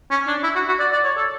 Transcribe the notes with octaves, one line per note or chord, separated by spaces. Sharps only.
C#4
D4
E4
F#4
F#4
D5
D5
C#5
A4